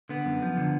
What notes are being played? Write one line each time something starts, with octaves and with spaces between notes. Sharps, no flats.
D3 B3
F#2
F3
D3